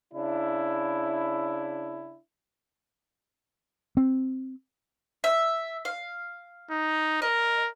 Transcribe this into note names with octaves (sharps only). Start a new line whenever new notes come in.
C#3 D4 E4
C4
E5
F5
D#4
A#4 D#5